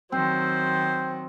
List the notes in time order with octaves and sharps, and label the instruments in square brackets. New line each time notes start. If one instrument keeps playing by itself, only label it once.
[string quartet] D#3 F#3 [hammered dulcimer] C4 [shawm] C5